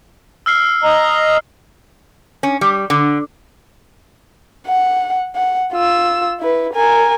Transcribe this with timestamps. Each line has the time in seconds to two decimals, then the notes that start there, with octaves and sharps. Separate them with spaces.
0.46 E6 F6 C7
0.84 D#5 A#5
2.43 C#4
2.61 G3
2.90 D3
4.66 F#5
5.35 F#5
5.73 F4 E6
6.40 E4 B4
6.74 A#4 G#5